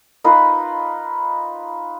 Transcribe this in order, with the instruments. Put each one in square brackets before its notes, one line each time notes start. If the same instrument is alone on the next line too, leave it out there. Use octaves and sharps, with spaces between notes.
[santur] D#4 F4 B4